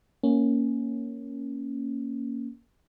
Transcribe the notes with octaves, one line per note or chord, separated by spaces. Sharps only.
A#3 C#4